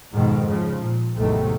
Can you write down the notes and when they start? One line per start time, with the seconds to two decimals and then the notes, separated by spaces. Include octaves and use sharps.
0.11 F2 G#2 B2 D#3
0.48 C#3 F3
0.81 A#2
1.17 A1 E2 C3 D#3 F#3 A3